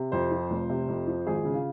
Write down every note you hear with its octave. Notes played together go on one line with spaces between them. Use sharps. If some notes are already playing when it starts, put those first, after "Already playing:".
Already playing: C3
F2 C5
F3
F1
C3
F2
F3
G#1 G#4
C#3
F4